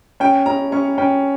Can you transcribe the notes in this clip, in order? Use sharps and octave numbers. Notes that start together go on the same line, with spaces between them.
C#4 G5
C#4 A#5
C#4 C#6
C#4 G5